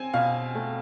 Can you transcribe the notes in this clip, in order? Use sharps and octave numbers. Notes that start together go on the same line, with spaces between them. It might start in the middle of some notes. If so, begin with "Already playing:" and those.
Already playing: C4 G#5
B2 F5
A3